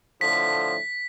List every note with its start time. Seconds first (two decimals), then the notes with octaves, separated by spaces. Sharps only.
0.21 A2 D3 F3 B6